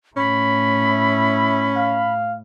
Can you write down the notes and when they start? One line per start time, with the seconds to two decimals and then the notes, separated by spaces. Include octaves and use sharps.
0.17 A2 C#4 B5
0.84 E4
1.76 F5